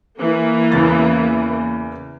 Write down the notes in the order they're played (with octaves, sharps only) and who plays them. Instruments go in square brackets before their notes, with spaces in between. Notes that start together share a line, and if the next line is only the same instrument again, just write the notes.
[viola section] E3 A#3
[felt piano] E2 C#3 A6